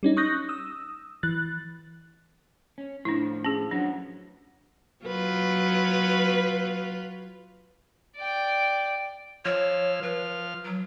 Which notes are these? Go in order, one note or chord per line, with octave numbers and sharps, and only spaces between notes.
G3 C#4 D#4
C#6 D#6 F#6 G6 A#6
D#6 E6
E3 F#6 A6
C#4
A2 F3 D4 E4
C#4 G#4
F3 F#3 B3 D4
F#3 F4 B4
D5 G5
F3 C#5 E6 F6
F3 B4 F6
F#3